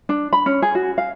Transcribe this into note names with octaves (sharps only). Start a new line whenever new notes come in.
D4
B5
C#4
G#4
F#4
F5